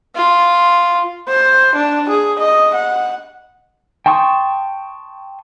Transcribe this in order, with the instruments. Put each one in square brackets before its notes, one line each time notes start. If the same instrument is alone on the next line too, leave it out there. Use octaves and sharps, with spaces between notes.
[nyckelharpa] F4
[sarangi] C5
D4
G#4
D#5
F#5
[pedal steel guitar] G5 A5 C6 C#6 D#6